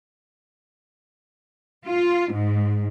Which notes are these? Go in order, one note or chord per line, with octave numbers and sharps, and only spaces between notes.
F4
G#2